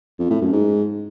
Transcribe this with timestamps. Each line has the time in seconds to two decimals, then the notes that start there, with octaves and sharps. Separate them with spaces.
0.19 F2
0.30 A2
0.41 F#2
0.52 G#2